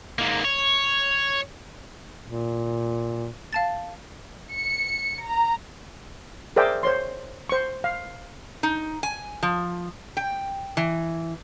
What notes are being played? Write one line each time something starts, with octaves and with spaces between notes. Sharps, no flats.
G#2 A#3
C#5
A#2
F5 A5 A6
C#7
A#5
G#4 A#4 C5 D5 E5 G5
C5 C#5 C6
C5 C#6
F5
D#4
G#5
F3
G5
E3